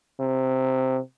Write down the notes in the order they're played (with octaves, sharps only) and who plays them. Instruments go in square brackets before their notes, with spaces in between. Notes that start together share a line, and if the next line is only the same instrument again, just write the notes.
[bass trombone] C3